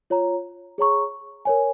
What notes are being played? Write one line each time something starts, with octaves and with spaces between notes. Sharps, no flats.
F4 C#5 A#5
G#4 C#5 A#5 C#6
A#4 C#5 G#5